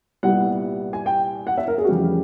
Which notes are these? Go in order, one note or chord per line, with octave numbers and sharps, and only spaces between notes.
C2 A#2 G3 B3 F#5
G#5
G5
F#5
E5
A#4
G#4
F#4
F1 F2 C#3 E3 G3 G4